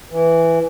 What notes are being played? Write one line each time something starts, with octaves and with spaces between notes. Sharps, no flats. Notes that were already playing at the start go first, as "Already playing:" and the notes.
E3